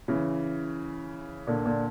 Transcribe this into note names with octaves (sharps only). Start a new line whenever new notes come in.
C#3 E3
A#2 D3
A#2 D3